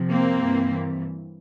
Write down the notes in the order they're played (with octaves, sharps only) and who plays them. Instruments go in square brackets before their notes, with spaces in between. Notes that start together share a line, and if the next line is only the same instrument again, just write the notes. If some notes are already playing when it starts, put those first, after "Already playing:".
Already playing: [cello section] F2 C3 F3
A#3 C4
G2 E3